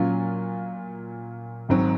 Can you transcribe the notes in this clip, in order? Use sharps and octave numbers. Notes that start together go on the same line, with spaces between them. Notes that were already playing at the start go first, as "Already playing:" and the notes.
Already playing: A#2 F#3 C#4 F4
G#1 G#2 F#3 C4 F#4